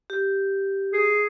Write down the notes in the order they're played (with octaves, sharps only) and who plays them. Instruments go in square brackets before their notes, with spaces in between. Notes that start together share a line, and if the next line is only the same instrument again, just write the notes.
[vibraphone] G4
[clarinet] G#4